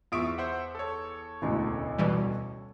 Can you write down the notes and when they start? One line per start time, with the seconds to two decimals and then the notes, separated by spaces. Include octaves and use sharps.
0.12 E2 F4 E5 C#6 D#6 D7
0.38 C5 E5 F#5
0.75 A4 C#5
1.42 E1 A1 D2
1.99 B2 E3 G3